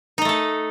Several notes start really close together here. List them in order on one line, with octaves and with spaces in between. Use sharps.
D#4 D#5 A3 A4